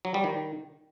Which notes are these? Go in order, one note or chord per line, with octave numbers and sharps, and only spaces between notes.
F#3
G3
D#3